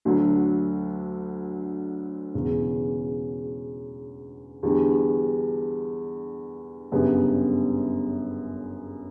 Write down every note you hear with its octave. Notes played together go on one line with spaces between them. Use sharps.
D2 D3 F#3
E1 E2 C#3
E2 D3 G3
G1 F#2 C#3 G3 B3